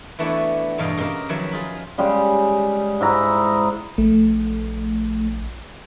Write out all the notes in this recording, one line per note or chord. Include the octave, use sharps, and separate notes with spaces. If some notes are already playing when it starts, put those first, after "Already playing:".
E3 A3 B3 D4 E4 F#4
E2 G2 B2 D#5 F5 G5
C#3 C4 G4 A#4 F5
D#3 F3 F#3 B4 C#5 E5
F4 G#4 B5
C#3 G3 G#3
G#2 E4 A#5
A#1 A3